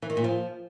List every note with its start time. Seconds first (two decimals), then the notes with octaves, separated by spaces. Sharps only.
0.02 E3
0.10 D#3
0.17 A#2
0.24 F3